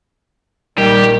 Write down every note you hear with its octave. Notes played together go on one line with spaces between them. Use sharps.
A#1 D#3 G3 G4